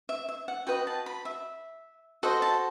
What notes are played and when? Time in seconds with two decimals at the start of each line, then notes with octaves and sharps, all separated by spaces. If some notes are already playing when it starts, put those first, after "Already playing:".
0.09 E5
0.29 E5
0.48 F#5
0.67 F#4 B4 D#5 G5
0.87 A5
1.06 B5
1.25 E5
2.23 F#4 A4 C5 D#5
2.42 A5